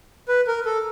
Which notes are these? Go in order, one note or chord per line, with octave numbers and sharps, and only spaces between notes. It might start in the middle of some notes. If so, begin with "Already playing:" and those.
B4
A#4
A4